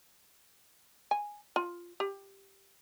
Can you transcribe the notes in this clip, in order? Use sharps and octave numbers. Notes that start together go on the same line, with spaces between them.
G#5
F4
G4